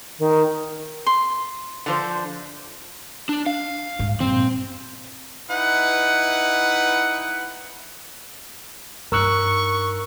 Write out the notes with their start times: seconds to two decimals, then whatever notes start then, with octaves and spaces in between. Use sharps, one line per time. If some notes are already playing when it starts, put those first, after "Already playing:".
0.19 D#3
1.06 C6
1.86 D3 F3 C5
3.29 D4
3.46 F5
3.99 G#2
4.20 G2 A#2 C4
5.50 D#4 E4 B4 F#5
9.12 G2 D#4 A#4 C#6 E6 F#6